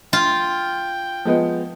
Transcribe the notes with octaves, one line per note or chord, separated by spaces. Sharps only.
F4 G5
F3 G#3 B3